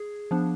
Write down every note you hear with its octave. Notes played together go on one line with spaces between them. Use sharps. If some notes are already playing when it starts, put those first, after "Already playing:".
Already playing: G#4
F3 B3 D4